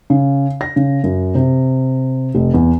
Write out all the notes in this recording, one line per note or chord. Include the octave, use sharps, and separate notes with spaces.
C#3
A#6
C#3
F#2
C3
F1
E2